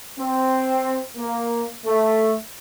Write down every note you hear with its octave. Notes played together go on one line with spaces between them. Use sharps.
C4
A#3
A3